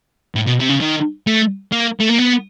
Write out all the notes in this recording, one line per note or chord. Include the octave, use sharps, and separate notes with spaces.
A2
B2
C3
C#3
D#3
A3
A#3
A3
A#3
B3